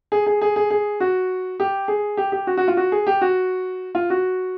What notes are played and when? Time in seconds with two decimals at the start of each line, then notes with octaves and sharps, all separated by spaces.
0.12 G#4
0.26 G#4
0.42 G#4
0.56 G#4
0.70 G#4
1.00 F#4
1.60 G4
1.88 G#4
2.17 G4
2.32 G4
2.47 F#4
2.57 F#4
2.68 F4
2.77 F#4
2.92 G#4
3.07 G4
3.21 F#4
3.95 F4
4.10 F#4